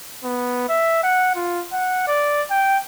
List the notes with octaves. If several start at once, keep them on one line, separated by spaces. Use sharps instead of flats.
B3
E5
F#5
F4
F#5
D5
G5